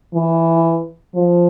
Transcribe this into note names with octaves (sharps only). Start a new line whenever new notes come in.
E3
F3